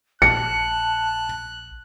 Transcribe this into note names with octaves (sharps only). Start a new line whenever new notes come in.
A#1 A5 F#6 C#7